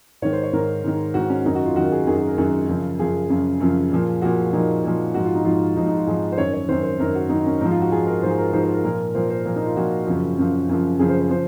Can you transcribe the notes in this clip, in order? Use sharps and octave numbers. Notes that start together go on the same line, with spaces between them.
G#2 D#3 C#5
C5
C#5
G#2 D#3 A#4
G#2 D#3
G#2 D#3 F#4
C#4
F#2 D#3 D#4
F#4
F4
F#2 D#3 F#4
G#4
F#2 D#3 G#4
F#4
A#4
F#2 D#3 G#4
F#2 C#3 F3
F#2 C#3 F3 G#4
F#2 C#3 F3
F#2 C#3 F3
A#2 F3
A#2 F3 F#4
A#2 F3 D#4
A#2 F3
G#2 F3 F#4
F4
D#4
G#2 F3 F4
G#2 F3 D#4
D#4
F4
G#2 F3 G#4
C5
F#2 D#3 C#5
C#5
F#2 D#3 C5
C5
F#2 D#3 A#4
F#4
F#2 D#3 D#4
C#4
G#2 F3 D#4
F4
F#4
G#2 F3 G#4
A#4
G#2 F3 C5
G#4
A#4
G#2 F3 C5
C5
A#4
A#2 F3 A#4
A#2 F3 C5
C5
A#2 F3 A#4
D#4
F4
A#2 F3 F#4
F#2 C#3 F3
F#2 C#3 F3
F#2 C#3 F3
F#2 C#3 F3 G#4
C5
C5
C#3 F3 C5